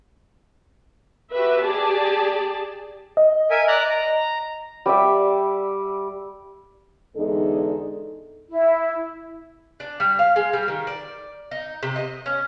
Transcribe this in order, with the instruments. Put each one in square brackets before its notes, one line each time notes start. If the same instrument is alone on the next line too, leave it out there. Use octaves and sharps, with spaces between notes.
[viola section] F#4 G4 B4 E5
G4 G#4 D5 A5
[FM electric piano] D#5
[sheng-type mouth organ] A#4 E5 G#5
D5 A#5 F#6
A#5
[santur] G3 D5 E5
[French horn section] E2 D3 G#3 D#4 G#4 A4
[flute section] E4
[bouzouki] D4
G3
F5
G#3
G3
D#3
D5
D#4
C3
D#5
C#4